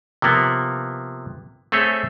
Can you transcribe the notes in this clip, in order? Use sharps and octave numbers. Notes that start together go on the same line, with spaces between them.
C3 F3 A#3 B3
A3 C4 G#4 A4 C#5 E5